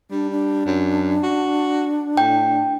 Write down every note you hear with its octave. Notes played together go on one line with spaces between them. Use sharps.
G3 D4
D4
F#2
F#4
A2 G5